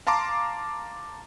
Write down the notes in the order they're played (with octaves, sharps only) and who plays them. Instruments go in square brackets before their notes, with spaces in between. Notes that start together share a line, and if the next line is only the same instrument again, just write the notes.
[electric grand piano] F5 A5 A#5 C6 D6